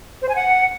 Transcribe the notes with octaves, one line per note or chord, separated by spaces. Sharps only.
C5
G#5
F#5